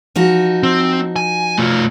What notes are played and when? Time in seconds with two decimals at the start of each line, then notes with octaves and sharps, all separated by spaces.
0.16 F3 D#4 F#4
0.63 C4
1.16 G#5
1.58 A3 F4